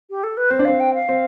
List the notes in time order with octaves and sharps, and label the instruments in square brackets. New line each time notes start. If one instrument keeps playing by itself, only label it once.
[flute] G4
A4
B4
[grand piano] C4 [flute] C5
[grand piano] D4
[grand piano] C4 [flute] F5
[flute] G5
F5
[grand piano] C4